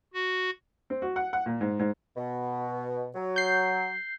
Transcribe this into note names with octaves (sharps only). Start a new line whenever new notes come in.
F#4
C4
F#4
F#5
F#5
A#2
G#2
G#2
B2
F#3
G6 C7